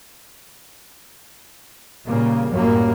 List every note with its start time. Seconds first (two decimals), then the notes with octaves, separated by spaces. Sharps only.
2.06 A#2 C#3 G3 A#3
2.51 F#2 A2 F#3 G3 A#3